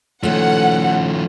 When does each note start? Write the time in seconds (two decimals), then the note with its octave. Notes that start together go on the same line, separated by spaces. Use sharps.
0.24 D#3 F3 A3 C#4 F#5